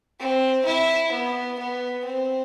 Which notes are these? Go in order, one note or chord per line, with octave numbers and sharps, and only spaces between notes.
C4
E4
B3
B3
C4